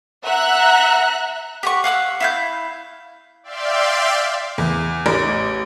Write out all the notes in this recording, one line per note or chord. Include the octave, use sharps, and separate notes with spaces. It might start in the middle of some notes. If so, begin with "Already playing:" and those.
E5 F#5 A#5 F#6
G4 F#5 C#6
F5 F#5 D#6 E6
E4 F5 G6
D5 E5 F5 G5 C6
E2
A1